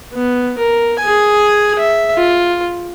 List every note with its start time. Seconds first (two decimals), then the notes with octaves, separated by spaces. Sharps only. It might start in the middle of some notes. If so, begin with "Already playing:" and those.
0.13 B3
0.58 A#4
1.00 G#4 G#5
1.79 E5
2.14 F4